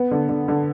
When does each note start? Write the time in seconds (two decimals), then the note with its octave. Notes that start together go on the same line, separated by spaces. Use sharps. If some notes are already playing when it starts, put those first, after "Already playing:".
Already playing: B3
0.11 D3
0.29 D3
0.48 D3